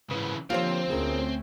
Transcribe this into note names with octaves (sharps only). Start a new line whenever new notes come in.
G#2 C#3 E3 B4
D3 F3 A#3 C4 F4 G4 C5 C#5
D2 A3 B3 C#4 G#4 A#4